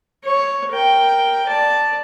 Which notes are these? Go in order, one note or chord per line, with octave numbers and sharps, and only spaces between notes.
C#5
A#4 G5
D5 A5